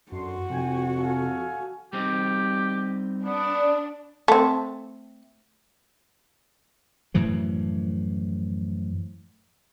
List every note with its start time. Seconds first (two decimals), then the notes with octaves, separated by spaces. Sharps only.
0.12 F#2 D4 F#4 A4 C6
0.50 F2 C3 E3 G5 G#5
0.98 A4 F5 G#5
1.93 G3 C4 D#4 G4
3.25 B3 D4
4.28 A3 C4
7.14 F#2 A2 E3 F3